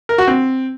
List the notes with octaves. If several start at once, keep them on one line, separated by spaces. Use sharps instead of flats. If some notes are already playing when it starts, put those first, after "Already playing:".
A#4
F#4
C4